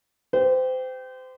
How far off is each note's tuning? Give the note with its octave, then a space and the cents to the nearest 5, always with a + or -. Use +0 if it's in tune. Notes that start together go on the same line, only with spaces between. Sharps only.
G4 +0 C5 -30